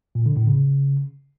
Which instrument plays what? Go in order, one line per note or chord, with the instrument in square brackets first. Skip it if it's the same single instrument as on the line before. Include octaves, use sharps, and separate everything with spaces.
[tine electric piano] A#2
D3
A2
C#3